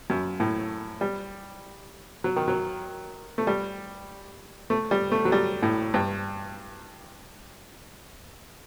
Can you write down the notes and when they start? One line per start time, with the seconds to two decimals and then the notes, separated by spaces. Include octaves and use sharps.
0.10 F#2
0.40 A2
1.01 G3
2.24 F#3
2.36 D#3
2.48 F#3
3.38 A3
3.47 G3
4.70 A3
4.91 G3
5.12 A3
5.25 F#3
5.32 G3
5.63 A2
5.94 G2